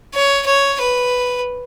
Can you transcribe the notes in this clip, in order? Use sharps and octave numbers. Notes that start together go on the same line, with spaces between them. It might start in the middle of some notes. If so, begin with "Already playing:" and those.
C#5
C#5
B4